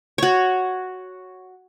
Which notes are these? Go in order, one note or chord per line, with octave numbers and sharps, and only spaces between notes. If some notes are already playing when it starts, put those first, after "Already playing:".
F#4 C#5